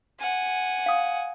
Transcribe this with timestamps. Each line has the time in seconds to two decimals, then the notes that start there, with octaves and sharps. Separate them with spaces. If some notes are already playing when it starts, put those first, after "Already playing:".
0.20 F#5 G#5
0.86 F5 D#6